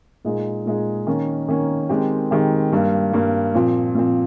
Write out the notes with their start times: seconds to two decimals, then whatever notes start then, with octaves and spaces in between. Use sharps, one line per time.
0.25 A#2 G#3 D#4 G#4
0.66 A#2 G#3 D#4 G#4
1.07 D#3 A#3 C#4
1.49 D#3 A#3 C#4
1.89 D#3 G#3 C4 G4
2.31 D#3 G#3 C4 G4
2.72 G2 G3 A#3
3.13 G2 G3 A#3
3.55 A#2 F3 C4
3.95 A#2 F3 C4